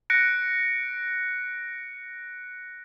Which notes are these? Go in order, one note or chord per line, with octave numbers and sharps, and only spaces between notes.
F#6 A#6 C#7 D7